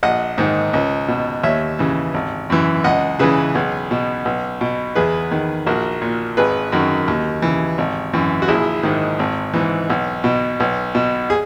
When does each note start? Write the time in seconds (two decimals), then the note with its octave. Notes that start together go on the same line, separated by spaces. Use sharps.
0.03 A#1 D#5 F#5
0.38 G#2 D#3
0.73 C#2
1.08 B2
1.44 D#2 C#5 E5
1.79 C#3 E3
2.14 G#1
2.50 F#2 E3
2.84 C#2 D#5 F#5
3.19 C#3 E3 G#4 B4
3.55 B1
3.91 B2
4.25 B1
4.61 B2
4.95 E2 G#4 B4
5.31 D#3
5.66 A#1 F#4 A#4
6.02 A#2
6.37 G#1 G#4 B4
6.72 F#2 D#3 F#4 A#4
7.08 D#2
7.42 C#3 E3
7.78 G#1
8.13 F#2 E3
8.42 F#4
8.48 A#1 E4 G#4
8.83 G#2 D#3
9.19 G#1
9.54 G#2 E3
9.90 B1
10.24 B2
10.60 B1
10.95 B2
11.30 G#4